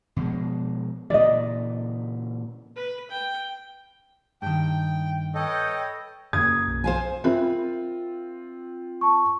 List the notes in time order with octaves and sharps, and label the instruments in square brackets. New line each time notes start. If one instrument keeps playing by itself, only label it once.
[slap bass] B2 F3 G#3
[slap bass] A#2 C#3 E3 [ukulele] D5 D#5
[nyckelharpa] B4
G5
[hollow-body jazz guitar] G2 D#3 [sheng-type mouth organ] G5
[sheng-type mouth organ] A4 D#5 [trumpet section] B4 C#5 G5
[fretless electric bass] F#2 C#3 A#3 [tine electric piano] D#6 [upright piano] G#6
[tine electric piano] B1
[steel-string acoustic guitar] C5 F5 G#5
[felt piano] C4 F4 [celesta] A#4 E5 B5
[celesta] A5 C#6